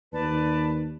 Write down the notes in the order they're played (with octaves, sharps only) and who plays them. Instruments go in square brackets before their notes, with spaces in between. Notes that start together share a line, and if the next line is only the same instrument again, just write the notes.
[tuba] D#2 [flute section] B4 D5 A5